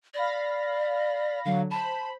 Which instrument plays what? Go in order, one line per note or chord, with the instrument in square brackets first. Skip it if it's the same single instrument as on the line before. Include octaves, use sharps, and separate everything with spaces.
[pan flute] D5 [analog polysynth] F5 B5 A#6
[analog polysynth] D3 F#3 [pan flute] F5
[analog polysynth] C5 B5 [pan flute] A5